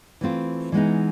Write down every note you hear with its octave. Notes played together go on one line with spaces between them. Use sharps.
E3 A3 C4 F4
E3 G#3 B3 D#4